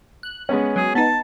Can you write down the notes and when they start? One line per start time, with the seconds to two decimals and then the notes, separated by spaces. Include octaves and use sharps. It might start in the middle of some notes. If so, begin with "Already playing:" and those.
0.23 F#6
0.49 G#3 B3 C#4
0.76 F#3 G#4
0.95 B3 D#4 A5